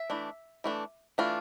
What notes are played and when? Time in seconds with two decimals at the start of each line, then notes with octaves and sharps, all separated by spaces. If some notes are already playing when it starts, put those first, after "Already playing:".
Already playing: E5
0.10 E3 A3 D4
0.64 E3 A3 D4
1.18 E3 A3 D4 F4